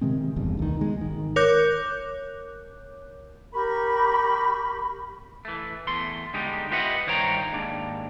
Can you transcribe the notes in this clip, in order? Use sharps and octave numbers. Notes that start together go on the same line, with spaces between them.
C3 D#3 G#3 C4
F#1 B1 E2 G2
D2 D#3
B2 G#3
G#1 D#3
A#4 C#5 D6 F#6 G6
G4 A#4 B5 C#6
E3 A3
E2 A3 C6
D3 G3 G#3 D#4 G4
F4 G4 B4 D#5 E5 F#5
G2 D#3 C5 C#5 G5 A#5
D#2 G#2 D4